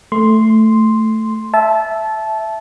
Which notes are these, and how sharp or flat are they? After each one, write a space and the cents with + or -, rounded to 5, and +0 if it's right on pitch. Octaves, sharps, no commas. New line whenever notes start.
A3 +0 C6 +0
E5 +0 A5 -20